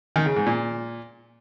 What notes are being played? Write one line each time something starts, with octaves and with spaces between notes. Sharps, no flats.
D#3
C#3
G#2
A#2